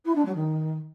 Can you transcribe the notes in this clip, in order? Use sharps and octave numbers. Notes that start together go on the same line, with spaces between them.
E4
D4
F#3
D#3